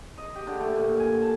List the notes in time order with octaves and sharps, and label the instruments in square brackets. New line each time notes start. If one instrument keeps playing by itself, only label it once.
[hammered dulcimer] D#5
G4
D3
A3
A#2
G#5
A5